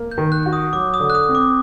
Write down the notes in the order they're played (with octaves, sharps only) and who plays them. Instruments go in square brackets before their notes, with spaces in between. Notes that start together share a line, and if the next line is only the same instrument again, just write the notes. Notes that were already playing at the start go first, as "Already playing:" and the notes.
Already playing: [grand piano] A#3
[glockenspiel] G6
[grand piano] D#3
[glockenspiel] F#6
[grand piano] F#4
[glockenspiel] D#6
[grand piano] F#3 [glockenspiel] D6
[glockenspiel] D#6
[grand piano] D3
[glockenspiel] F#6
D#6
[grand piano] C4
[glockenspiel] D6